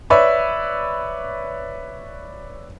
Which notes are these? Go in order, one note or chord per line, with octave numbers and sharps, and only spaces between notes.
B4 C#5 D5 E5